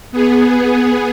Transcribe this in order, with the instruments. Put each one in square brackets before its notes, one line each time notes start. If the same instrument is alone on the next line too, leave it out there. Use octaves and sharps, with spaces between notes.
[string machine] B3 G#4